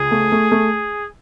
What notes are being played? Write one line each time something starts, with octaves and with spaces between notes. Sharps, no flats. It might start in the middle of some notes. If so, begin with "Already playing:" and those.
Already playing: C#2 G#4
A3
A3
A3